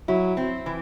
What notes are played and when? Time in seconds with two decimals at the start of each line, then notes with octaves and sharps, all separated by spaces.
0.08 F#3 E4
0.37 C4
0.66 E3